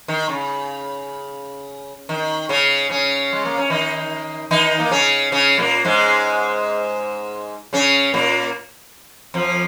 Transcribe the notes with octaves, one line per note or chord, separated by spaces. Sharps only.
D#3
C#3
D#3
C#3 C#4
C#3 C#4
G#3
A#3
C#4
D#3 D#4
D#3 D#4
A#3
C#3 C#4
C#3 C#4
A#2 A#3
G#2 G#3
C#3 C#4
A#2 A#3
F2 F3